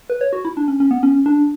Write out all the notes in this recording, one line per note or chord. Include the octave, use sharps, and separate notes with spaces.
B4
C#5
F#4
E4
D4
C#4
C#4
B3
C#4
D4